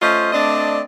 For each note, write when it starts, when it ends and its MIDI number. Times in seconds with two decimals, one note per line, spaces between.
0.02 0.30 57
0.02 0.30 61
0.02 0.30 65
0.02 0.30 72
0.02 0.30 75
0.33 0.81 57
0.33 0.81 60
0.33 0.81 62
0.33 0.81 74
0.33 0.81 75